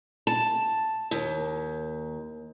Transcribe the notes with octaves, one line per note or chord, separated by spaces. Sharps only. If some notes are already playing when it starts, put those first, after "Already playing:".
A5
D#2